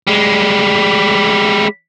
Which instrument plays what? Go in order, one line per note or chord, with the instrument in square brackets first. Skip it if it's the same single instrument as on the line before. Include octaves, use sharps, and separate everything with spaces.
[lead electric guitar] G3 G#3